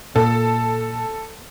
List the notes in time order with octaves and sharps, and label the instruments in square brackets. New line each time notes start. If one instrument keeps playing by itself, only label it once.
[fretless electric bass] A#2 [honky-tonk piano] A4